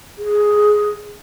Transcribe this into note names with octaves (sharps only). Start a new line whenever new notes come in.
G#4